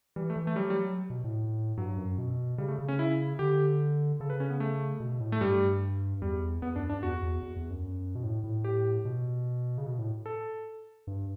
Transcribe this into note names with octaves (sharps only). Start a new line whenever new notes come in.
E3 G3
A3
E3
A3
F#3 G3
G3
B2
A2
G2 F#3
F#2
B2
C#3 G3
A3
C#3
C#4
E4
D3 G4
C#3 A4
B4
C#4
B3
A3
B2
A2
A3
G2 G3
E2 G3
E2 B3
F#2 D4
G2 D4
E2 F#4
E2
E2
E2
F#2
B2
A2
A2
G4
B2
C#3
B2
A2
A4
G2